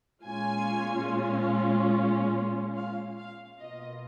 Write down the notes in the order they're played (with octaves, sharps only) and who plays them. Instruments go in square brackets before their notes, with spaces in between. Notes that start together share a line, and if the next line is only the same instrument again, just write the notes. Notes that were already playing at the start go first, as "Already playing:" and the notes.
[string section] A#2 G#3 C#4 F4 G#5
F5
F5
B2 A#3 F4 D#5